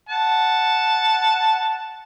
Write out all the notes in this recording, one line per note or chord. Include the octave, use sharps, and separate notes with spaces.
F#5 A5